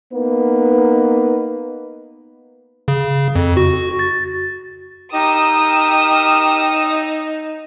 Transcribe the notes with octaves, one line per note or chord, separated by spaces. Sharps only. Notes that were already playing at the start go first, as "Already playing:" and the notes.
A#3 B3 D#4 B4
C#3
F2
F#4
A6
D#4 G4 A#4 D#6 E6